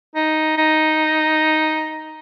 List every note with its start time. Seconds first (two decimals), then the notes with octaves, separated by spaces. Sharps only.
0.15 D#4
0.57 D#4